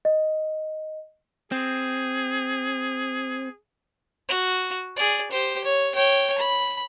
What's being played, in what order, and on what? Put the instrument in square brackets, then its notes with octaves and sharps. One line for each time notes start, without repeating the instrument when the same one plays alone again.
[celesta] D#5
[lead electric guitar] C4 [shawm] G#4
[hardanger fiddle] F#4
G#4 D5
G4 C5
C#5
C#5 G5
B5